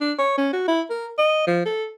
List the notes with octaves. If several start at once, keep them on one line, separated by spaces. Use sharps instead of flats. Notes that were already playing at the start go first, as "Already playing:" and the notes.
D4
C#5
C#4
F#4
E4
A#4
D#5
F3
A4